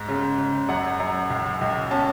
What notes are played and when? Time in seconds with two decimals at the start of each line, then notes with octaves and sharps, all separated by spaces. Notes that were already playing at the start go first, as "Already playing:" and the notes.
Already playing: G#2
0.08 C#3
0.38 C#3
0.69 F#2 F#5
1.00 F#2
1.30 C#2
1.61 C#2
1.91 C#4 A5